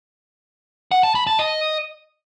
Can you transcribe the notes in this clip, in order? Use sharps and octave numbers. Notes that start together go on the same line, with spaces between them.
F#5
A5
B5
A5
D#5